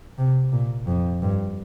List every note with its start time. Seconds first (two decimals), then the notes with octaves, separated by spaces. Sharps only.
0.18 C3
0.52 A#2
0.87 F2
1.22 G2